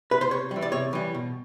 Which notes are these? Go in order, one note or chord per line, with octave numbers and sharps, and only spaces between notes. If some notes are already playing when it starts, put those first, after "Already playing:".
B4
C5
C3 C#5
G3
E3
D5
C3 C#5
E3 G3
B2